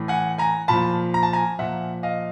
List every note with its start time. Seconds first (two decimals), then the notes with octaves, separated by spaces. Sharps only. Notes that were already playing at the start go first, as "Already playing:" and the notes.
Already playing: A2 E3
0.08 F#5 G#5
0.38 G#5 A#5
0.68 A#2 F3 A5 B5
1.14 A#5
1.23 A5
1.33 G#5 A#5
1.59 A#2 F3 E5 F#5
2.03 D#5 F5